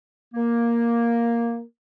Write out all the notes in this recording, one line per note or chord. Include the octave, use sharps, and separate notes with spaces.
A#3